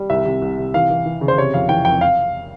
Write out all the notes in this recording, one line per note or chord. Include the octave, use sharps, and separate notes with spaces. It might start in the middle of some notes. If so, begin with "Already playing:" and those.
Already playing: G3
C2 E5
C3
C2
C3
E3 F5
E3
E3
C#3
C5
C3 C#5
F2 F5
E3 G5
F2 G5
F5